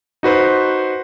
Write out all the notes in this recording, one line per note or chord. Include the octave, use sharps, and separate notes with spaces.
D#4 F#4 B4 C5